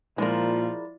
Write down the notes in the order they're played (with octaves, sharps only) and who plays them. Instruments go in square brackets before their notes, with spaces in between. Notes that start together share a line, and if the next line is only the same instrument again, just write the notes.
[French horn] A#2 [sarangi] F3 [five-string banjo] G#3 A#4 [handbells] E4 D5